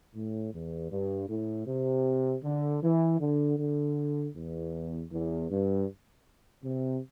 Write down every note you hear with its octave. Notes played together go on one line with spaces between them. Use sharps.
A2
E2
G2
A2
C3
D3
E3
D3
D3
E2
E2
G2
C3